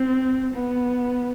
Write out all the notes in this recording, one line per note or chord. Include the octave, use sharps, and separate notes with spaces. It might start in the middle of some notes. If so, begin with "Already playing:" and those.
Already playing: C4
B3